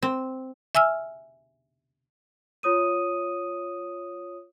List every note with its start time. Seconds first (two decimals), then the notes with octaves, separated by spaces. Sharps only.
0.03 C4
0.75 E5 G#5 E6 F6
2.63 F4 C#5 D#6 D#7